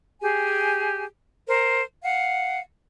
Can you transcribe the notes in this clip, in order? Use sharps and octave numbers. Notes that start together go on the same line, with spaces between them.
G4 G#4 G#5
A#4 C5
F5 F#5